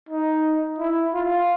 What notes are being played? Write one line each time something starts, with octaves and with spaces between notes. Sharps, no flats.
D#4
E4
F4